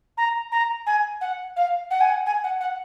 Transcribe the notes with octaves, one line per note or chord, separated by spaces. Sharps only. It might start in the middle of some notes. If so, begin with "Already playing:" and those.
A#5
A#5
G#5
F#5
F5
F#5
G#5
F#5
G#5
F#5
F#5